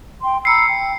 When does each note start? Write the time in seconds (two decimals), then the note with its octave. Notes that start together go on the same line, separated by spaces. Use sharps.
0.22 G5 C6
0.45 A#5 B5 E6 C7 C#7
0.66 G5